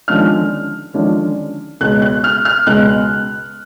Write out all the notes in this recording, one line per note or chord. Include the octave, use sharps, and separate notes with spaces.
D#2 D3 F3 G#3 C#4 F6
D#2 D3 F3 G#3 C#4
C#2 B2 G#3 F#6
F#6
F6
F6
C#2 B2 G#3 F#6